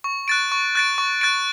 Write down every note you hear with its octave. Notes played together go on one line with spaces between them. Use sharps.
C#6
F#6 A6 D7
C#6
F#6 A6 D7
C#6
F#6 A6 D7